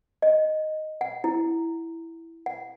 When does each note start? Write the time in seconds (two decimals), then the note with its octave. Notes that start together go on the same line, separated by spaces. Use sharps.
0.22 D#5
1.01 F#5
1.24 E4
2.46 F#5